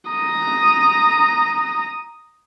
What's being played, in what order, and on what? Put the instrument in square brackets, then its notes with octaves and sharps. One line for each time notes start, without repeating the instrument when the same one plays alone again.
[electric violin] A#5 D#6